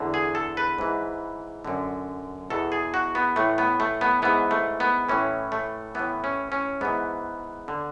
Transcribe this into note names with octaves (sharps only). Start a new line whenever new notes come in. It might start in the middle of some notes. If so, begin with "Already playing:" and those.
Already playing: E2 D3
G#4
A4
B4
G#2 E3
F#2 D3
E2 B2 A4
G#4
F#4
B3
A2 E3 A3
B3
A3
B3
G#2 E3 B3
A3
B3
A2 E3 C#4
A3
A2 E3 B3
C#4
C#4
G#2 E3 B3
D3